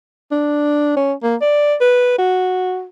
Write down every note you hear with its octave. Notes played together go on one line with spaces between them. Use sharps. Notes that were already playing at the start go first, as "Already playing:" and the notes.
D4
C#4
A#3
D5
B4
F#4